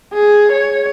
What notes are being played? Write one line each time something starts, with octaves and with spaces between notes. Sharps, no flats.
G#4
C#5